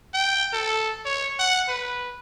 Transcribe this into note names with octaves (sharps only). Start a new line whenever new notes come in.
G5
A4
C#5
F#5
B4